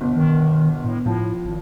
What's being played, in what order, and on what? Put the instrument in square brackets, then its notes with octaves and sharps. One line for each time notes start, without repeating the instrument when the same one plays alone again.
[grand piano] G1 B2
[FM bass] D#3
A2
[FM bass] A2 [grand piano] F3
[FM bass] G#1